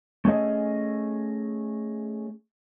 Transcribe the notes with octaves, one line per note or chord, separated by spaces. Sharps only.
A3 C#4 G#4 D#5